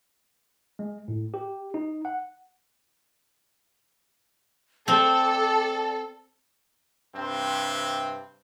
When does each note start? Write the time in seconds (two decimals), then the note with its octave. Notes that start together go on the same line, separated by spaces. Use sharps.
0.79 G#3
1.08 A2
1.34 G4
1.74 D#4
2.05 F#5
4.88 C4 A4 D5
7.15 G2 C3 C4